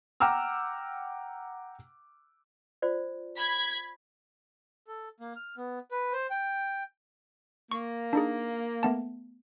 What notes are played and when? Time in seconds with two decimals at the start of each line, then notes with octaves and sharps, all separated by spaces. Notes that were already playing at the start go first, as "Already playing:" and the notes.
0.20 F#5 G5 A#5 D6 E6 F6
2.82 F4 C5 D5
3.36 B5 G#6 B6
4.87 A4
5.20 A#3
5.36 F6
5.57 B3
5.91 B4
6.13 C5
6.30 G5
7.72 A#3 C#6
8.13 D4 D#4 G#4
8.83 A3 B3 A5